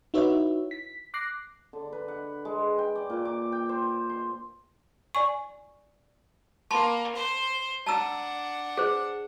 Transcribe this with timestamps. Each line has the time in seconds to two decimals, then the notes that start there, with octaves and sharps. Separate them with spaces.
0.14 D#4 E4 F#4 B4 C#5 E5
0.71 B6
1.14 D6 F#6 A#6 C7
1.73 D3
1.92 B4
2.08 F#5
2.45 G#3
2.78 G5
2.95 D5
3.10 A#2
3.25 D6
3.52 G5
3.69 C5
4.09 C6
5.15 D5 G#5 C#6
6.71 A#3 A5 B5 C6
7.15 C5
7.87 D4 F#5 A5 A#5 E6
8.77 G#4 C5